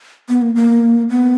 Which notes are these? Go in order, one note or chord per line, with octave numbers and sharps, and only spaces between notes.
B3
A#3
A#3
B3